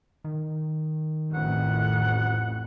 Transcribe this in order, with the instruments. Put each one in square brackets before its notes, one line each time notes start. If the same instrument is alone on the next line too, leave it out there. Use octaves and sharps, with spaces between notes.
[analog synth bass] D#3
[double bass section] A1 F2 [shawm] F#5